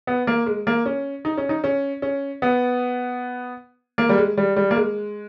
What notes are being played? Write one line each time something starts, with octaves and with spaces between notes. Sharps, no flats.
B3
A#3
G#3
A#3
C#4
D#4
C#4
D#4
C#4
C#4
B3
A#3
G3
G#3
G3
G3
A#3
G#3